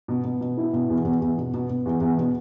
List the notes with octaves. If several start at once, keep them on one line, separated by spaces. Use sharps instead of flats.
B2
B2
B2
E4
B2
E2
E2
E2
B2
B2
B2
E2
E2
B2